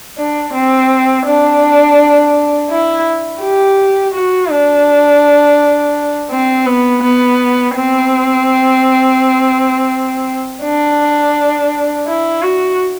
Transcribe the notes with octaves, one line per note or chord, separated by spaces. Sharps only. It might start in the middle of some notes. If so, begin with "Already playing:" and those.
D4
C4
D4
E4
G4
F#4
D4
C4
B3
B3
C4
D4
E4
F#4